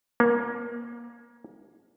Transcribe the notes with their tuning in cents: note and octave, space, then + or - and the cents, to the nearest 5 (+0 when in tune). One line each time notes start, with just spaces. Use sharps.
A#3 +25